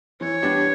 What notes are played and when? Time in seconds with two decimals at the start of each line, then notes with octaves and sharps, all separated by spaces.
0.21 E3 C#5
0.42 G3 B3 D4 G4